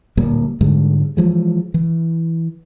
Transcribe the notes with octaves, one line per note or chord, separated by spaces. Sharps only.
D1 A#2 G3 A#3
G#2 D3 G3 G#3
E3 F3 G#3
E3